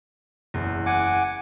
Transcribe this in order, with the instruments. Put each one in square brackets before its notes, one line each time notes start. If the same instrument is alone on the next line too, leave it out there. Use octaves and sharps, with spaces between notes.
[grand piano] F#1 E2
[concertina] F#5 G#5 D6